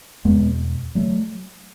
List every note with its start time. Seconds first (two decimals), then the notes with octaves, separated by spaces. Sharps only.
0.24 E2 B2 G#3 B3
0.95 F#3 A3